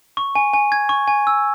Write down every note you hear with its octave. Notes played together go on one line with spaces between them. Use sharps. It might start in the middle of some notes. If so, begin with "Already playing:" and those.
C#6
G#5
G#5
G#6
C#6
G#5
E6